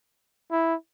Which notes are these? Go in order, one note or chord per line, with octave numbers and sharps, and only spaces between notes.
E4